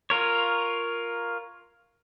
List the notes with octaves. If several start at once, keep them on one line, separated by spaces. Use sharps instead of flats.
F4 A#4 C#5